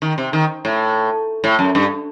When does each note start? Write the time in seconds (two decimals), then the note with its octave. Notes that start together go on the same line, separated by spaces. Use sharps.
0.02 D#3
0.18 C3
0.33 D#3
0.65 A2
1.44 A2
1.59 F#2
1.75 G2